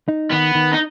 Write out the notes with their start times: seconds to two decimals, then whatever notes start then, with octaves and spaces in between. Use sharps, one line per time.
0.08 D#4
0.32 D#3 B3
0.55 D#3
0.73 D#4